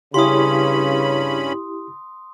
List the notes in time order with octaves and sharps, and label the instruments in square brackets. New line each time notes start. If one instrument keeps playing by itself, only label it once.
[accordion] G2 C#4 B5 [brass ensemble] C#3 [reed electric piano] E4 G4 [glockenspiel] C6 D#6